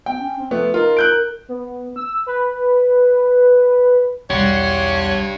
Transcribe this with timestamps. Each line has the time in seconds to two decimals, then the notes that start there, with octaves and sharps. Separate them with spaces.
0.06 B3 G5
0.18 C#4
0.38 C4
0.51 F3 A3 B3
0.74 D#4 F4 A#4
0.97 F#6 G6 D7
1.48 B3
1.96 E6
2.27 B4
4.30 B1 E2 G3 D4 G4 C#5 F#5 C6